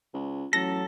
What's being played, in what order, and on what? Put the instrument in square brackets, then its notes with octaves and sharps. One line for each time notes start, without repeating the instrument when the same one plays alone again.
[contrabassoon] C#2
[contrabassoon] A1 [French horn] F#3 [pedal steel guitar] A4 [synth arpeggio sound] A#6